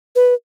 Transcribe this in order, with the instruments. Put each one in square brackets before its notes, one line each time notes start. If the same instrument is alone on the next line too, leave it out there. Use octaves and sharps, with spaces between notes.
[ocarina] B4